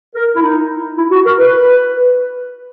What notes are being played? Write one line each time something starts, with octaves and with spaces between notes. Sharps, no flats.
A#4
E4
D#4
E4
F#4
A#4
B4